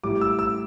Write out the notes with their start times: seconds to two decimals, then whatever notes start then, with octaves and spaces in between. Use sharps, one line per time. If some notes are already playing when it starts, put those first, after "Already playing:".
0.04 A2 G3 D6
0.21 E6
0.39 E6